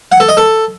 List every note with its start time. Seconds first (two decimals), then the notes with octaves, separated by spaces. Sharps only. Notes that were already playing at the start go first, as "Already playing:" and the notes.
0.12 F#5
0.20 A4
0.29 D#5
0.37 A4